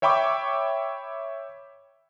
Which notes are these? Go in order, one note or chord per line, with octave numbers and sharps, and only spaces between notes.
C#5 E5 G5 B5 C#6 D6